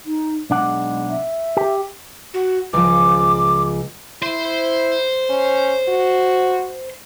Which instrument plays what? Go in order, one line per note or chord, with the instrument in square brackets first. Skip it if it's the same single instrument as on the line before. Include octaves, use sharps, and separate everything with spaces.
[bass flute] D#4
[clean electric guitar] B1 D4 F#5 [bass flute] G#3
[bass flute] E5
[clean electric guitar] G4
[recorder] F#4
[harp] C#2 F3 [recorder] D6
[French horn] E4 [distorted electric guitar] C5
[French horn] C#4
F#4